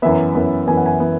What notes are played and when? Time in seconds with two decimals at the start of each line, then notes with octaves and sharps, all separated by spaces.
0.02 F#2 E3 B3 E5
0.35 F#2 E3 B3
0.67 F#2 E3 B3 G#5
0.77 F#5
0.86 G#5
1.00 E3 B3